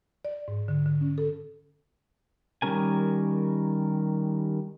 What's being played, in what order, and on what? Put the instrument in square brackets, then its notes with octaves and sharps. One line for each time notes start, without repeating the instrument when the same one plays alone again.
[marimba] D5
G#2
D3
D3
C#4
A4
[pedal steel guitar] D#3 G3 C#4 A#4 G#5